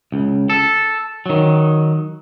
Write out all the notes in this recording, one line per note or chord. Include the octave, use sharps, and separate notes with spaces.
C#2
A4
D#3 F#3